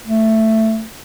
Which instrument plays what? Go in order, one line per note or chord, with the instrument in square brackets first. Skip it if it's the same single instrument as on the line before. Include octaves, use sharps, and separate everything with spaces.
[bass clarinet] A3